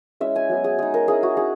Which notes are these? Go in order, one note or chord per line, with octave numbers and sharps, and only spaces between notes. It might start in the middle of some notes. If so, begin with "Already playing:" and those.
G#3 C#4 E4 E5
G#5
F#3 B3 E4
G#4
G#3 D#4 G#4
A#4
G#3 C#4 E4 G#4
F#4
D#4 G#4